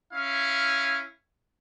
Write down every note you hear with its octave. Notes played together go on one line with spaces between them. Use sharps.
C#4 E4 F5